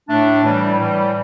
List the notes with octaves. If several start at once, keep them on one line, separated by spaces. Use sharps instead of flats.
A2 A3 D4
A2 E3 G3
A2 E3 G3